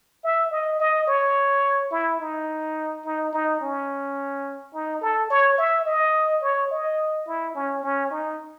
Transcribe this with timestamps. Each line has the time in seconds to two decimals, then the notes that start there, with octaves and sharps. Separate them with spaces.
0.24 E5
0.51 D#5
0.80 D#5
1.08 C#5
1.91 E4
2.20 D#4
3.05 D#4
3.33 D#4
3.61 C#4
4.74 D#4
5.01 A4
5.30 C#5
5.58 E5
5.85 D#5
6.42 C#5
6.71 D#5
7.27 E4
7.55 C#4
7.83 C#4
8.11 D#4